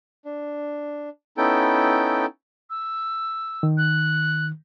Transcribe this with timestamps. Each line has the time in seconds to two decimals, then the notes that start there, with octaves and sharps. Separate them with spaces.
0.25 D4
1.37 B3 C#4 D#4 E4 A4 G5
2.70 E6
3.63 D#3
3.78 F#6